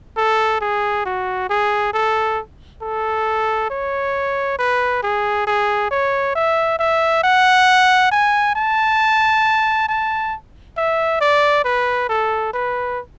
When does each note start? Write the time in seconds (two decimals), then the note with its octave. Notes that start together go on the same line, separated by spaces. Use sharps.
0.17 A4
0.61 G#4
1.05 F#4
1.49 G#4
1.93 A4
2.82 A4
3.70 C#5
4.59 B4
5.03 G#4
5.47 G#4
5.91 C#5
6.35 E5
6.79 E5
7.23 F#5
8.11 G#5
8.56 A5
9.88 A5
10.77 E5
11.21 D5
11.64 B4
12.09 A4
12.53 B4